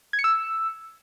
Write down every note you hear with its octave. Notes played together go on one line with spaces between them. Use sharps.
G#6
C#7
E6